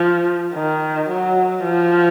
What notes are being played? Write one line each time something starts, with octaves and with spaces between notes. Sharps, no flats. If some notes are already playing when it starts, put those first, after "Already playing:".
Already playing: F3
D#3
F#3
F3